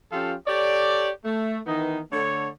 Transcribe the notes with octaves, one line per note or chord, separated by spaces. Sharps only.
F3 C#4 F4 G4 A4 F5
G4 A4 C#5 D5
A3
D#3 E3 B3 D#4
D3 A3 C#5